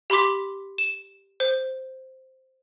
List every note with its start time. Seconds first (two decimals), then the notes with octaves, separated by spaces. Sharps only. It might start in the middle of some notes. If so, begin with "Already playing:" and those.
0.10 G4 B5 C6 D6 B6
0.78 E7
1.40 C5